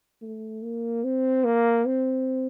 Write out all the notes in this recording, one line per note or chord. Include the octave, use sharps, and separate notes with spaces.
A3
A#3
C4
A#3
C4